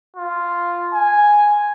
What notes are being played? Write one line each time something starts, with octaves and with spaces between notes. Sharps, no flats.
F4
G#5